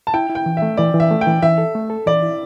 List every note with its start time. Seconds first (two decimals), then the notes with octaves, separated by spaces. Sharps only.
0.07 A5
0.14 E4 G5
0.30 E4
0.35 G5
0.46 E3
0.57 E5
0.62 A3
0.77 E3 D5
0.94 E3
1.00 E5
1.11 A3
1.21 G5
1.27 E3
1.42 E3 E5
1.58 A4
1.75 A3
1.90 A4
2.07 E3 D5
2.22 E4